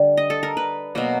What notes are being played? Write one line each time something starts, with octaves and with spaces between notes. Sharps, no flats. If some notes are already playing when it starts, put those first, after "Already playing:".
Already playing: D3 G3
D#5
A4
A#4
B4
B2 F#3 A#3